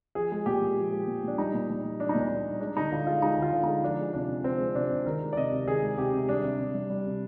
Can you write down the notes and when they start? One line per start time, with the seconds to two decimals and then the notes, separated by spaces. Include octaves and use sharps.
0.15 F3 G#4
0.32 G#3
0.46 A#2 G4
0.62 A#2
0.78 F3
0.92 G#3
1.08 A#2
1.23 A#2 D4
1.38 G3 D#4
1.54 A#2
1.69 A#2
1.85 G3
2.00 G3 D4
2.09 D#4
2.15 A#2 D4
2.30 A#2 D4
2.45 G3
2.60 G#3 D4
2.76 D3 D#4
2.91 D3 F4
3.07 G#3 F4
3.22 G#3 D#4
3.38 D3 F4
3.52 D3
3.64 G#3 D#4
3.84 F3 D4
3.99 G#3
4.14 C3 D4
4.29 C3
4.44 F3 C4
4.60 G#3
4.75 C3 D4
4.91 C3
5.06 D#3 A#4
5.22 G#3
5.33 D5
5.37 C3 D#5
5.52 C3
5.67 D#3 G#4
5.82 G#3
5.97 C3 G4
6.13 C3
6.29 G3 D4
6.44 C3
6.59 C3
6.74 G3
6.90 G3
7.06 C3